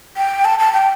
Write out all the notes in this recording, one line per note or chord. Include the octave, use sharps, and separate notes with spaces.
G5
A5
A5
G5